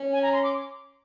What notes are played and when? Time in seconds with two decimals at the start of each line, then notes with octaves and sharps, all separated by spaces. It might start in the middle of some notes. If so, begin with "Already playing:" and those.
Already playing: C#4
0.13 G#5
0.23 A#5
0.33 C6
0.43 D6